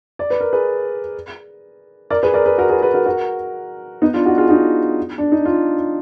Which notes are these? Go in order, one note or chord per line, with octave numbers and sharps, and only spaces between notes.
D5
B4
A#4
G#4 B4
A#4 D5
G#4 B4
A#4 D5
G#4 B4
F#4 A#4
G#4 B4
G#4 B4
F#4 A#4
F#4 A#4
B3 D#4
D4 F4
D#4 F#4
F4 G#4
D#4 F#4
D4
D#4
D4 F4